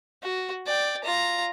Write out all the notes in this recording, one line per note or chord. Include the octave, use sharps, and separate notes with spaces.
F#4
D5 G5
F4 A#5